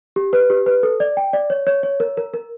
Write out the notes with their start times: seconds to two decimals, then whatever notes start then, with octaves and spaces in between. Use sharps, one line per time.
0.16 G4
0.33 B4
0.50 G4
0.66 B4
0.83 A4
1.00 D5
1.17 G5
1.33 D5
1.50 C#5
1.67 C#5
1.83 C#5
2.00 A#4
2.17 A#4
2.34 A#4